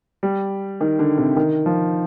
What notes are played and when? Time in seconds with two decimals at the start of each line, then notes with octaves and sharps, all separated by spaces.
0.23 G3
0.81 D#3
0.99 D3
1.18 C3
1.37 D#3
1.66 F3